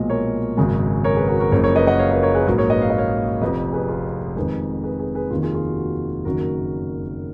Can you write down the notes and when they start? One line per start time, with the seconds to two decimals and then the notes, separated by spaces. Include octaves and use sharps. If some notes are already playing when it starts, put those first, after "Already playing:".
Already playing: B1 A#2 F3 G#3 D#5
0.10 A#4 C#5
0.57 G#1 F#2 C#3 G#3
1.04 A#4 C#5
1.16 G#4 B4
1.28 F#4 A#4
1.40 F#4 A#4
1.52 F#1 F#2 F3 A#4 C#5
1.64 A#4 C#5
1.75 B4 D#5
1.87 D#5 F#5
1.99 C#5 F5
2.11 B4 D#5
2.23 A#4 C#5
2.34 G#4 B4
2.46 A#1 G#2 F#3 F#4 A#4
2.58 A#4 C#5
2.70 B4 D#5
2.82 F5
2.90 D#5
2.98 C#5 F5
3.41 F1 F2 F3 B4 D#5
3.73 G#4 B4
3.88 F4 G#4
4.36 F2 D#3 G#3 G#4 B4
4.83 G#4 B4
4.99 G#4 B4
5.15 G#4 B4
5.31 F1 D#2 D#3 F4 G#4
5.43 F4 G#4
5.54 F4 G#4
5.66 F#4
5.78 F#4
6.25 F#1 F#2 D#3 F#4 A#4